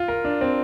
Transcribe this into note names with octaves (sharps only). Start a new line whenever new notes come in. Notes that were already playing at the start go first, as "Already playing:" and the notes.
Already playing: F4
A#4
D4
C4